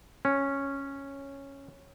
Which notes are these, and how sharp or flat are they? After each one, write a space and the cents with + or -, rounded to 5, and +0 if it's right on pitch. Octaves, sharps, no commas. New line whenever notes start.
C#4 -5